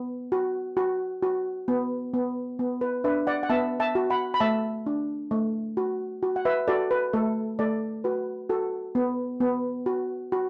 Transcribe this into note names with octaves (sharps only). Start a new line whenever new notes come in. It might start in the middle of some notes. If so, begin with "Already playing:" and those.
Already playing: B3
F#4
F#4
F#4
B3
B3
B3
B4
D4 B4 E5
D5 F#5
F#5
B3 E5 A5
E5 A5
F#4
F#5 B5
B5
A3 E5 A5
D4
A3
F#4
F#4
F#5
B4 E5
F#4 A4 D5
B4
A3 A4
A3 A4 D5
F#4 B4
F#4 A4
B3
B3
F#4
F#4